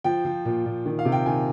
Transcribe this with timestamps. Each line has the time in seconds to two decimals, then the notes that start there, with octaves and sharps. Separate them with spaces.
0.04 F3 G5
0.25 F3
0.45 A#2
0.66 A#2
0.85 D#3
0.99 F5
1.05 C3
1.12 G5
1.26 D#3 G#5